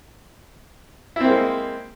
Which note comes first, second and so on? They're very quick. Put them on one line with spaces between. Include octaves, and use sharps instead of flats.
E4 C4 A#3 G#3